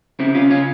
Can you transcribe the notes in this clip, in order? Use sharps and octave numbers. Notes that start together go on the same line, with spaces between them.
C#3 C4 E4
C#3 C#4 F4
C#3 C#4 F4